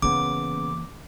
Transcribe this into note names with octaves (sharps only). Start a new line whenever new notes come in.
C#3 E3 A#3 B3 D6